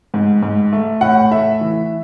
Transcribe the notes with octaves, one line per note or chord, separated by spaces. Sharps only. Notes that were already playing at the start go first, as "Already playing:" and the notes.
G#2
G#2
A3
A2 F#5
A3 E5
E3